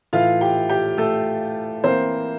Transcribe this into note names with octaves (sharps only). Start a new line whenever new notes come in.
A2 E3 A3 F4 F5
G4 G5
G4 G5
A3 A4
E3 A#3 C4 C5